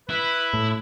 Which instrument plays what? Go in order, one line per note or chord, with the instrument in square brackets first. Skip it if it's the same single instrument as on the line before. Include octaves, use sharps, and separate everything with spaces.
[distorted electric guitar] E4 [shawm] B4
[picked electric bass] A2